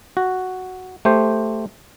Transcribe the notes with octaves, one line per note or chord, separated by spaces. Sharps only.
F#4
A3 G4 C5